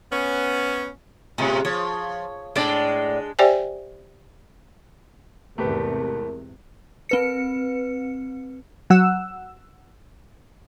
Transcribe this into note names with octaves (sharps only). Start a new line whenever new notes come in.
B3 C#4
A2 C3 G#3 C#4 F4
F3 C#5
A2 G#3 D4 D5
G4 C5 D5 E5 G5 G#5
E2 G#2 C3 A3 G4 A#4 B4
C4 B4 C#7
F#3 F#5 E6